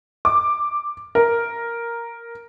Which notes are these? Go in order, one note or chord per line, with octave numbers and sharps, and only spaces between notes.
D6
A#4